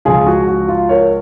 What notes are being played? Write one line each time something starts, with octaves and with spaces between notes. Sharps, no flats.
C#2 C#3 F3 F4 G#4
F#4
F#4
F4
A#4 C#5